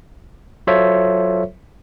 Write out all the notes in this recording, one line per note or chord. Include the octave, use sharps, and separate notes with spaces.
F#3 F4 A4 C5 C#5 E5